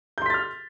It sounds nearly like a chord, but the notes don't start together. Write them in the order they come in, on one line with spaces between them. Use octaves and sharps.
G6 C6 B6 A6 F6